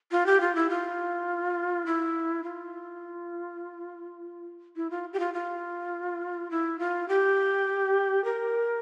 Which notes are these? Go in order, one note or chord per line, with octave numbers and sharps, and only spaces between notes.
F4
G4
F4
E4
F4
E4
F4
E4
F4
G4
F4
F4
E4
F4
G4
A#4